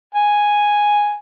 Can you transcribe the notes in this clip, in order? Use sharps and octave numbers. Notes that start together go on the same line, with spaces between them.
G#5